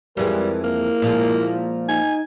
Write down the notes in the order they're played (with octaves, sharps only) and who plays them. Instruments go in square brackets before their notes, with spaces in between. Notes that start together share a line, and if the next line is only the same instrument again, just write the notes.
[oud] F2 E3 G#3 [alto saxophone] G3 [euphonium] A#4
[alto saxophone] A#3 [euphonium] E4
[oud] A#2 F3 G#3
[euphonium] D#4 [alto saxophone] G#5